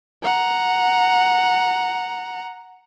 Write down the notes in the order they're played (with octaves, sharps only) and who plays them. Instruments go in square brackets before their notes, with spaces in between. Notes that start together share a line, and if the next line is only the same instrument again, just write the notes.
[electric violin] F#5 A#5